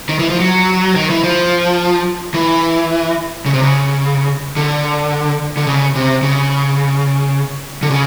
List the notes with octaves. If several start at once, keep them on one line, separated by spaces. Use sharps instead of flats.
D#3
E3
F3
F#3
D#3
E3
F3
E3
C#3
C3
C#3
D3
D3
C#3
C3
C#3
D3
C#3